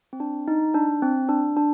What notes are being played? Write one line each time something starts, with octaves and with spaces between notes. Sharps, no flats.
C4
D4
D#4
D4
C4
D4
D4